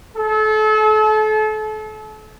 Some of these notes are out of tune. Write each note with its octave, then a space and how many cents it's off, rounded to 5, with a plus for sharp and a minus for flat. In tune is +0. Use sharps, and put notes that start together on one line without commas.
A4 -35